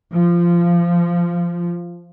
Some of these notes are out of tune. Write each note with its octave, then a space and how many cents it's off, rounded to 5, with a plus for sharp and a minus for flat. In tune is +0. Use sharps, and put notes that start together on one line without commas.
F3 -15